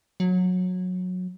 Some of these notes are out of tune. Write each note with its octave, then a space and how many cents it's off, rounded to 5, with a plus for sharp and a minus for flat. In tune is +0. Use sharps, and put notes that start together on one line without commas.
F#3 -20